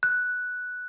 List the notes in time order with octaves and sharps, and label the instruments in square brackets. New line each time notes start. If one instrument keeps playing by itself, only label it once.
[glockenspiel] F#6